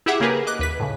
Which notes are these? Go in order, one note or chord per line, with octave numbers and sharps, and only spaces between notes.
E4 G4 G#4 E5 F#5 D6
C#3 A#3 G4 G#4 A#4 B4
D#5 D6 F#6
D#2 B4 B6
A2 C#3